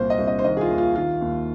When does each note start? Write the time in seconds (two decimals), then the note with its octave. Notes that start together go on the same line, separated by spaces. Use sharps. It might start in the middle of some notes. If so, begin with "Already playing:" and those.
Already playing: C2 A#2 C5
0.10 D#5
0.19 C2
0.27 D#5
0.39 C5
0.44 D#3 D#5
0.57 G#4
0.61 F4
0.69 D#2
0.78 F4
0.96 D#3 F4
1.21 D#2